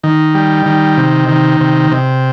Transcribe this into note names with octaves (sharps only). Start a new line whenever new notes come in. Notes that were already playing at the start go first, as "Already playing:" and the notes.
D#3
G3
D#3
C3
D#3
C3
C3